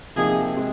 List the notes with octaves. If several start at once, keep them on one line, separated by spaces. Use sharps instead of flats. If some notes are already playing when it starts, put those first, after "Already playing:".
C3 F3 A#3 D#4 G#4
C3 G#3